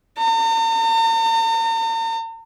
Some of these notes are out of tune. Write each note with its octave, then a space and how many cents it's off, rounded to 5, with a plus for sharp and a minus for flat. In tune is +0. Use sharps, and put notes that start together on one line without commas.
A#5 -45